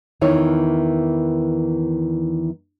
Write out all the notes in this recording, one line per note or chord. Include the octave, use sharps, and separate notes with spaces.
E2 D#3 E3 D#4 C#5